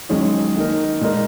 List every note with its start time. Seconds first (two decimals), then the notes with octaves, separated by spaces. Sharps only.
0.09 F#2 D#3 G#3 C#4 G#4
0.56 D#3 A#3 D#4 A#4
1.01 A#2 G#3 D#4 A#4